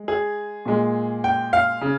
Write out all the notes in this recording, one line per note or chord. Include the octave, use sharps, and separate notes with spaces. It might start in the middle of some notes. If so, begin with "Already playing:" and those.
Already playing: G#3
G#4
A#2 G#3
G5
F5
C#3